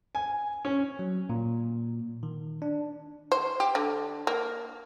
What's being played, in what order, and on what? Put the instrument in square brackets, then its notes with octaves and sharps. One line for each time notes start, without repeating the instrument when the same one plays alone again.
[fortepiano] G#5
C#4
[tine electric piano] F#3
A#2
D#3
D4
[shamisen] C5
G4
D3
A#3